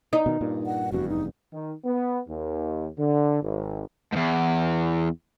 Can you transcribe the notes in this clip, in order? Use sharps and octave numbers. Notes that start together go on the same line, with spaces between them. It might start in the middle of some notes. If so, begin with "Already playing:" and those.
D#4
B2 D#3
G2 A#2
F#5
F1 E2 G2 F#4
D#4
D#3
B3
D#2
D3
G#1
E2 G#2